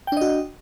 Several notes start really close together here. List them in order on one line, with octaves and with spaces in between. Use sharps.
G5 D4 D#5 F#4